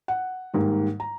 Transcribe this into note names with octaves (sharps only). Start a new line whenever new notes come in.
F#5
G#2 D#3 G3 A#3
A#5